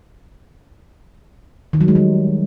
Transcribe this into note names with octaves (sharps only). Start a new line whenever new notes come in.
D#3
F#3
G#3
G3